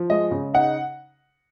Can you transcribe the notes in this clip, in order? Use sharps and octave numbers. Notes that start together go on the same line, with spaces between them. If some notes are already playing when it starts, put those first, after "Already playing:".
Already playing: F3
G#3 D#5
C#3
D#4 F#5